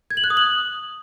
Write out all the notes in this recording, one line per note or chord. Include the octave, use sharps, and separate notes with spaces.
G#6
F#7
F#6
D#6
F#7